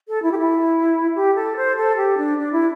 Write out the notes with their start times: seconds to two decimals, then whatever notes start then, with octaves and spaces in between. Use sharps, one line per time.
0.08 A4
0.23 E4
0.32 G4
0.38 E4
1.15 G4
1.35 A4
1.57 C5
1.77 A4
1.97 G4
2.18 D4
2.38 D4
2.53 E4